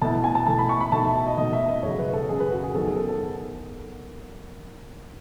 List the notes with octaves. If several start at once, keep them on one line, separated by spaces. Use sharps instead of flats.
B2 A3 E4 A5
G#5
A5
B2 A3 E4 A5
B5
C#6
B5
B2 A3 D#4 F#4 A5
E5
E5
D#5
B2 A3 D#4 F#4 D#5
E5
D#5
F#2 C#3 F#3 C#5
B4
A4
F#2 C#3 F#3 G#4
B4
F#4
G#4
D#3 F#3 B3 A4
G#4
A4
A4